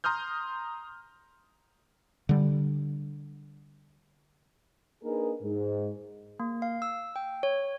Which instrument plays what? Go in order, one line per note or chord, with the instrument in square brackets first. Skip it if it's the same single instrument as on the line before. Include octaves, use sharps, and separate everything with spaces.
[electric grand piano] A#5 C6 D#6 F6 G6
[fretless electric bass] D3 G3
[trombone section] A#3 D4 D#4 G#4 A#4 B4
G#2
[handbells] A#3
F5
E6
G5
C#5